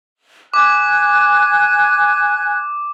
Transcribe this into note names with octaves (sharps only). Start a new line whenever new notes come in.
G#5 D6 F#6 G#6